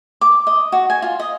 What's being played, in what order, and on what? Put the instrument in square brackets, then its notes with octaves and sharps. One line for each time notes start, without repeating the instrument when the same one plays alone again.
[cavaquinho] D6
D#5
F#4
G#5
F4
D#5